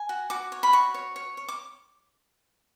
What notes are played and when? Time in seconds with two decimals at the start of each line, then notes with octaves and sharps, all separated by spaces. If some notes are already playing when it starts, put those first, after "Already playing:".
Already playing: G#5
0.09 F#4
0.30 F#4 D6
0.52 C#5
0.63 B5
0.73 F#4 C#6
0.94 C#5
1.16 C#5
1.37 C#5
1.49 D6